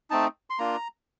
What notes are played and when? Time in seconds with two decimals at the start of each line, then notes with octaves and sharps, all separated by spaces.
0.10 A3 C4 D#4 A5
0.50 C6
0.59 A#3 D4 F4 A#5